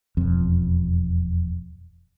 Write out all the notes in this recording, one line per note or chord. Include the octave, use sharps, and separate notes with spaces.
E1 F2